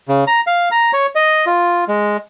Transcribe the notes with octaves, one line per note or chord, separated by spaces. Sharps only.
C#3
A#5
F5
A#5
C#5
D#5
F4
G#3